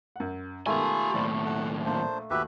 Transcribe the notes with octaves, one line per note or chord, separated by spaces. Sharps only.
F#2 F#5
B2 D#3 G#3 A3 F4 G4 G#5 B5
D#2 A2 E4 C5 D5
F#5
A#1 A#2 D4 C5
D#2 F#4 G4 B4 E5 F#6